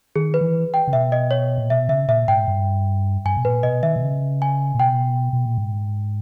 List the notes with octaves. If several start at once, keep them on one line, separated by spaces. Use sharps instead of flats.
D#3 G#4
B4
E3
G5
C#3
B2 E5
D#5
C#5
A#2
B2 E5
C#3 E5
A#2 E5
G#2 G5
G2
G2 G#5
B2
A#2 B4
B2 D#5
D#3 E5
B2
C#3
G#5
A#2
B2 G5
B2
A#2
G#2